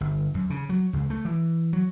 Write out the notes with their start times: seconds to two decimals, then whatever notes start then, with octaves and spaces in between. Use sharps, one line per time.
0.01 G1
0.34 F#2
0.50 C#3
0.69 F#3
0.93 C#2
1.10 A3
1.25 E3
1.73 F#3